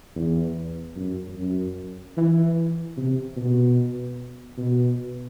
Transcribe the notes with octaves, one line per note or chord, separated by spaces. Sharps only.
E2
F#2
F#2
E3
C3
B2
B2